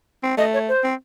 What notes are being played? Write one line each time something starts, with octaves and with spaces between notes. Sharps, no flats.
C4
A3 D#5
C#5
C5
C4